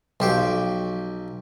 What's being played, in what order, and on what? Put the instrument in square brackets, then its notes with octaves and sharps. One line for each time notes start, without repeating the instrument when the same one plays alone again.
[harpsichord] B1 G4 G5 [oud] F3 F#3 F5